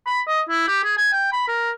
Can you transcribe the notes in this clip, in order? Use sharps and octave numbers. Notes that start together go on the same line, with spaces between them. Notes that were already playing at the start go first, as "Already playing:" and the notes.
B5
D#5
E4
G4
G#4
G#5
G5
B5
A#4